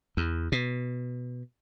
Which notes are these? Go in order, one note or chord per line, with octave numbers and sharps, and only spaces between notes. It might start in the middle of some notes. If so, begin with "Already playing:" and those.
E2
B2